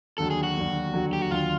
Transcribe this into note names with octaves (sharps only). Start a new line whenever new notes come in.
D#2 D3 F#3 A4
G#4
F#4
D#2 D3 F#3
D#2 D3 F#3
G4
F#4
D#2 D3 F#3 F4